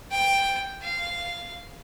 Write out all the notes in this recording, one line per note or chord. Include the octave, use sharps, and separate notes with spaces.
G5
F5